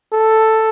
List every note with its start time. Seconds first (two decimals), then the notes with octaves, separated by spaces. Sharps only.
0.13 A4